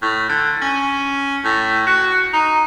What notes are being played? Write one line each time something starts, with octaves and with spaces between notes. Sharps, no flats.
A2
D3
C#4
A2
F#4
D#4